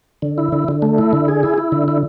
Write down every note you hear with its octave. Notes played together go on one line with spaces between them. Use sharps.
D3
E4
D3
D3
A3
E4
D3
G#4
E4
E4
D3
E4